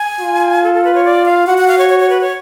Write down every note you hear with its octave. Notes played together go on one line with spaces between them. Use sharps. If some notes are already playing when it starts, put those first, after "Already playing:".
Already playing: G#5
F4
A4
A4
B4
C#5
D5
F5
F#4 F#5
F#5
F5
C#5
C#5
C#5
B4
C#5